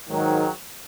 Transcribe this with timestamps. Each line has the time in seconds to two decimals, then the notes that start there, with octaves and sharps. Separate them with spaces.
0.08 G#2 D#3 F#3